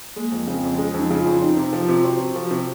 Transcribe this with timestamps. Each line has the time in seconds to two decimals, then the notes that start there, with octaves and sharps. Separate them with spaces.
0.16 G#3 A#3
0.32 F2
0.47 C#3 C4
0.63 F2
0.78 G#3 C#4
0.94 F2
0.99 D#4
1.10 C#3
1.20 F4
1.26 F2
1.41 C4 D#4
1.57 C3
1.73 F3
1.83 F4
1.88 C3
2.04 C4 F#4
2.19 C3
2.36 F3
2.51 C3